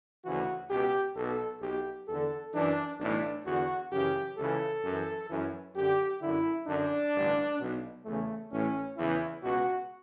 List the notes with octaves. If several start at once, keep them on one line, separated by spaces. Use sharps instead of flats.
D2 C#3 E3 F#4
C#2 B2 G4
B1 B2 A4
B1 B2 G4
E2 D3 A4
F#2 E3 D4
B1 A2 E3 D4
E2 D3 F#4
F#2 C#3 E3 G4
C#2 C#3 E3 A4
F#2 E3
F#2 E3
F#2 D3 G4
F#2 D3 E4
F#2 D3 D4
A1 G2 D3
B1 B2
E2 C#3 E3 A3
A1 A2 E3 C#4
E2 C#3 E3 E4
C#2 B2 F#4